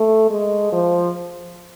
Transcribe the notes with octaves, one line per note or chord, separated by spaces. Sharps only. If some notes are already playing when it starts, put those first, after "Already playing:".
Already playing: A3
G#3
F3